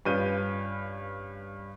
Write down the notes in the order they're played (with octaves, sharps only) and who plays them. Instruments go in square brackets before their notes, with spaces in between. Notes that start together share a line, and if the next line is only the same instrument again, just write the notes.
[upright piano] G2 C#4 F4 B4 G6 D#7